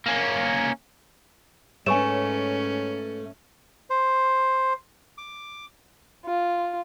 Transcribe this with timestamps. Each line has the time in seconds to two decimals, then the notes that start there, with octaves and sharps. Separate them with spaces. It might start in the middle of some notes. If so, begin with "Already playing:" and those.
0.06 A#3 C#4
1.86 G#2 A3 C#4 B4 C#5 G#5 C#6 E7
3.90 C5
5.18 D6
6.25 F4